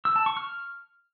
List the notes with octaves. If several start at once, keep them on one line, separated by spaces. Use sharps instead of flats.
E6
A5
C#6
F6